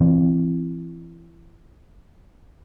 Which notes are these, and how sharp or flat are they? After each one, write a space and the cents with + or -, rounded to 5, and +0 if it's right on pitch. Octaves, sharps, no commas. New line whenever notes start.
E3 +30 C4 +0